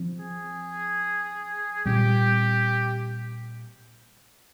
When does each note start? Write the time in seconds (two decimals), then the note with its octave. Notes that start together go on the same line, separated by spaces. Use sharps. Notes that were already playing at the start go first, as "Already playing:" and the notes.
Already playing: F3 C4
0.20 G#4
1.85 A#2 G3 C4 G4